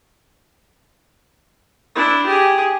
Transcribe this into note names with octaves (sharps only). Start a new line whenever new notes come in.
D4 E4
G4 G#4